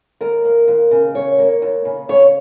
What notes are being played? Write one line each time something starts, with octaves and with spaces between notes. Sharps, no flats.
D#2 A#4
A#3
D#2
C#3
D#2 C#5
A#3
D#2
C#3
C#3 C#5